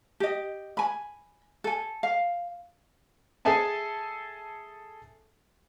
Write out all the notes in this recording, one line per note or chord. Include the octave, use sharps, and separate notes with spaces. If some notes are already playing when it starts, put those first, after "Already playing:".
G4 D#5
G#5 B5
A4 G#5
F5
G#4 A4 E5 G#5 A5